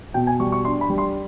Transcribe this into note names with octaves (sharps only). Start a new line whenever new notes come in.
B2 G5
G#5
G3 C#6
C#6
D4 C6
B5
G3
C6